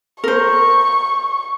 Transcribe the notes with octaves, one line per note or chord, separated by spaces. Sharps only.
A#4 C5 C#6